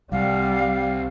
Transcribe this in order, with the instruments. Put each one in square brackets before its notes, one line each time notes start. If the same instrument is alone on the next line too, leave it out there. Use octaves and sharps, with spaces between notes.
[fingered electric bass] C2 [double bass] G3 [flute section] F5 F#5